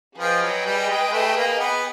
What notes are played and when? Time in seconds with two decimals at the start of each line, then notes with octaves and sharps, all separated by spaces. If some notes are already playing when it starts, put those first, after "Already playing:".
0.18 F3 G#4 B4 D#5 G5
0.42 F#3
0.66 G3
0.90 G#3
1.13 A3
1.37 A#3
1.60 B3